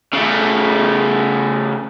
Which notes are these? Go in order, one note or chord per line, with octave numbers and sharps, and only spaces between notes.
C#3 A3